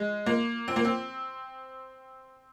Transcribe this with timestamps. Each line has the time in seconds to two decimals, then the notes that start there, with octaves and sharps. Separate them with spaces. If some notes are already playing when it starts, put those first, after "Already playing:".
Already playing: G#3
0.26 A#3
0.68 C4
0.76 A#3
0.85 C4